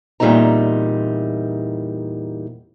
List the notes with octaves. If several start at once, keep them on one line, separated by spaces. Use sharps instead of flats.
E2 A#2 G3 C4 D#4 A#5